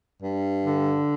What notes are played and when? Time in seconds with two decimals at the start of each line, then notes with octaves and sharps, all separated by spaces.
0.23 G2
0.66 D3